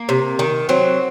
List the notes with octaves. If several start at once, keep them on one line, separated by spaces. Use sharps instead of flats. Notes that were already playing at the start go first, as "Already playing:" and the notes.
Already playing: A#3
C3
D#3
F#3 C4